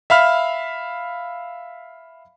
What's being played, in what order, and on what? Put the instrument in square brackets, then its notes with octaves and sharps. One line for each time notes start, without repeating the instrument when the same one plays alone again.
[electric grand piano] E5 F5 B5 F6